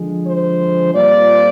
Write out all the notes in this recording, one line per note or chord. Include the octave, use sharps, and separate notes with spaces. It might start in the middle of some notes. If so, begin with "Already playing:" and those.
Already playing: D3 F3 G#3
C5
A#2 G3 C4 F4 D5